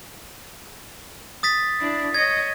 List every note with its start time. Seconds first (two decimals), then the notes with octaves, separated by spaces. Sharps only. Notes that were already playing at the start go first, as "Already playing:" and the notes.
1.43 D#6 A6 B6
1.81 D4 E4
2.14 C#5 D#5 G#6